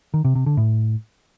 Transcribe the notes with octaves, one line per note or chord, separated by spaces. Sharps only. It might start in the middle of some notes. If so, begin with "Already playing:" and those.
D#3
C3
C3
D3
A2